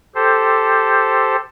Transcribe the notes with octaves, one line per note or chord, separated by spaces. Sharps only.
G4 A4 C5